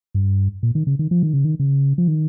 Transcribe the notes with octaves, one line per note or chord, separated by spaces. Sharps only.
G2
A#2
D#3
C#3
D#3
F3
D#3
C#3
D#3
C#3
F3
D#3